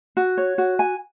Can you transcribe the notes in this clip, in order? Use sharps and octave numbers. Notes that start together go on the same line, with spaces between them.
F#4
C#5
F#4
G#5